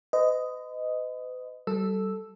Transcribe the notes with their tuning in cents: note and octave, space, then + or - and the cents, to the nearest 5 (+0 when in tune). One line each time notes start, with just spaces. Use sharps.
B4 +45 D#5 +0
G3 -30 A4 +0 E6 +0